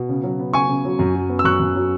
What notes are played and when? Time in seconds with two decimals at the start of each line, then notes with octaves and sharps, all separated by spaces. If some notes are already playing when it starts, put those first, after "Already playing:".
Already playing: B2
0.09 C#3
0.23 F#3
0.39 B3
0.53 C#3 G#5 C#6
0.69 C#3
0.85 F#3
0.99 F#2
1.15 F#3
1.29 B3
1.39 E6
1.45 F#2 C#6 F#6
1.60 F#2
1.76 F#3